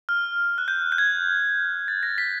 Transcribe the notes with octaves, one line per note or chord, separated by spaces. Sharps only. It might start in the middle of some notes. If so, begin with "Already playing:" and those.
F6
F#6
G6
G6
G#6
A6
A#6
B6